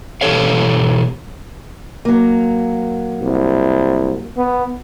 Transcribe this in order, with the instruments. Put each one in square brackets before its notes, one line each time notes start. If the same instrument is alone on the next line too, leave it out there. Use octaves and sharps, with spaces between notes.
[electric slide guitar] B2 E3 G4 A4 C#5 F5
[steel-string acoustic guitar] F#3 A#3
[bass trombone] C2
B3